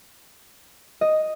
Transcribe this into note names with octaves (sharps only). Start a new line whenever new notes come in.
D#5